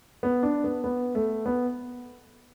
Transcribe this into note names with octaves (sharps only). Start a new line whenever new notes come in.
B3
D4
B3
B3
A3
B3